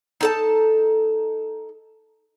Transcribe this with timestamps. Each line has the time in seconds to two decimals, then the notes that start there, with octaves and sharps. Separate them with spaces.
0.21 D#4 A4 A5